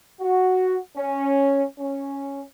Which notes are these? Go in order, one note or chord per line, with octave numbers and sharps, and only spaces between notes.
F#4
C#4
C#4